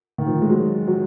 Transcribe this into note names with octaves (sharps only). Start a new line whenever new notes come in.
D#3
F3
G#3
F#3
F#3